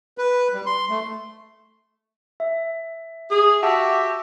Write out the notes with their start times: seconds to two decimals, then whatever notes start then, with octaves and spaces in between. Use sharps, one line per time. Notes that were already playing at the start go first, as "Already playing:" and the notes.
0.18 B4
0.54 G3
0.66 C6
0.89 A3
2.40 E5
3.31 G#4
3.63 F#4 G4 E5 F#5 A5